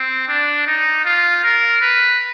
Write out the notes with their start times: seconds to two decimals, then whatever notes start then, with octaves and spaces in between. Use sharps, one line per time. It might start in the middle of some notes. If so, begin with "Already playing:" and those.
Already playing: C4
0.29 D4
0.67 D#4
1.05 F4
1.44 A#4
1.81 B4